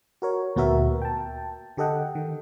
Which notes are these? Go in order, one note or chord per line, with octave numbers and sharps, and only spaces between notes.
F#4 A#4 C#5
D2 A#2 B3 F#4 A#4 E5
G5 A5
D3 G4 A4 D#5 F#5 G5
D#3